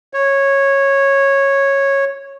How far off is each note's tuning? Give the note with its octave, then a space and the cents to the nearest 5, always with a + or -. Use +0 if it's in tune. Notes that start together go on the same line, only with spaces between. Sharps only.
C#5 -10